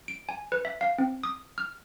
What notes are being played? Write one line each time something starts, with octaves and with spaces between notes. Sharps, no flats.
D7
G#5
B4
E5
F5
C4
D#6
F6